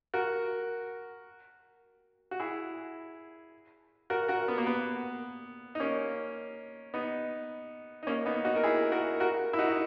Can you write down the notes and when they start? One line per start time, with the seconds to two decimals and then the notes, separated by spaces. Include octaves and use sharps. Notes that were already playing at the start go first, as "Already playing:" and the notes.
0.14 F#4 A#4
2.31 F#4
2.40 E4 G#4
4.10 F#4 A#4
4.28 F#4 A#4
4.48 B3
4.58 A#3
4.66 B3
5.75 D#4
5.80 A#3 C#4
6.94 B3 D#4
8.03 D#4
8.07 A#3 C#4
8.26 B3 D#4
8.45 D#4 F#4
8.56 A#4
8.63 E4 G#4
8.92 F#4 A#4
9.20 F#4 A#4
9.53 E4
9.58 D#4 F#4
9.69 D#4